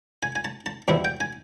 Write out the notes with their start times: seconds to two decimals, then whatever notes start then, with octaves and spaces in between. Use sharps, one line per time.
0.23 G#5
0.36 G#5
0.45 A5
0.66 A5
0.88 E2 B2 G3 C4 E4
1.05 G5
1.20 G#5